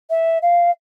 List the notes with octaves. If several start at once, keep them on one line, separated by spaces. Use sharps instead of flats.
E5
F5